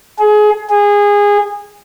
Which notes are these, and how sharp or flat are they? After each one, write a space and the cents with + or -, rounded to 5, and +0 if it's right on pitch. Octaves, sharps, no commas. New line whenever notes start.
G#4 +25
G#4 -20